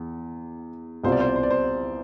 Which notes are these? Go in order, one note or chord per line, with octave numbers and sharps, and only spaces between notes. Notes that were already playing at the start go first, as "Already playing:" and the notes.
Already playing: E2
C2 B2 G3 C4 F4 C5
D5
C5
D5
C5
D5
C5